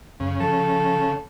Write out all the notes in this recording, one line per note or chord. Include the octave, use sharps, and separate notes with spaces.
F#2 C#3
F3 A4